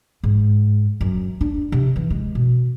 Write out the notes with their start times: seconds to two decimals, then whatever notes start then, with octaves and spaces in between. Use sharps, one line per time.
0.23 G#2
1.01 F#2
1.41 D4
1.72 C3
1.96 E3
2.10 G#3
2.35 B2